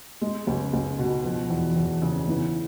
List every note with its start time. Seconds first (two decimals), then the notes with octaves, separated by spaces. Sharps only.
0.21 G#3
0.47 C#2
0.73 C#2
0.99 B2
1.24 F3
1.50 E2
1.76 E2
2.02 C#3
2.28 E3